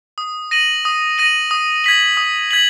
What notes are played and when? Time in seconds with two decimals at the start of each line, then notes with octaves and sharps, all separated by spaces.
0.18 D#6
0.51 A#6 D#7 F#7
0.85 D#6
1.18 A#6 D#7 F#7
1.51 D#6
1.84 G#6 B6 F#7
2.17 D#6
2.51 G#6 B6 F#7